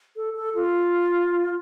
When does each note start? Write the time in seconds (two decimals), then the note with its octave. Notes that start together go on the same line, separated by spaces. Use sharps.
0.16 A4
0.36 A4
0.55 F4